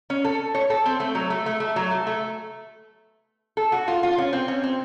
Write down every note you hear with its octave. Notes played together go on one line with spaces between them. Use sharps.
C#4
A4
C#5
A4
C4
A3
F#3
A3
A3
A3
F#3
A3
A3
A4
F#4
F4
F4
C#4
C4
C#4
C4